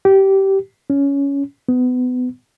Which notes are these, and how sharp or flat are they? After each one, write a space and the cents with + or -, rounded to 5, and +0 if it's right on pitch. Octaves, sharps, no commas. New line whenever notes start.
G4 -20
C#4 +15
B3 +25